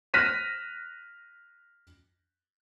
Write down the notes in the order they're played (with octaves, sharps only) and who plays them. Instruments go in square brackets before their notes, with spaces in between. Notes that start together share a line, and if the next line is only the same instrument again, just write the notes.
[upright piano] F6 F#6 A#6 B6 D#7 E7